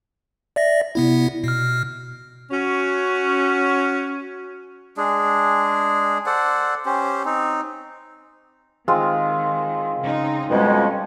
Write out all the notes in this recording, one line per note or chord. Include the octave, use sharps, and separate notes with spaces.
D5 E5 A#6
C3 B3 E4
B2 F6
C#4 F#4
G#3 D4 G#4
A4 C5 D5 F#5
C#4 G4 C5
C4 D#4
D#3 G#3 C4 F4
C#3 D#4
F2 B2 G3 G#3 C#4